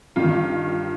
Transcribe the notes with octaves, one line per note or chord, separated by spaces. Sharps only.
G2 D#3 F4